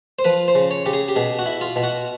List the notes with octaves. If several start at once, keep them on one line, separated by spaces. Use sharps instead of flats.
C5
F3 B4
C5
C#3
C#5
C#3 G4
G#4
G4
B2 G#4
F#4
E4
F4
B2
F#4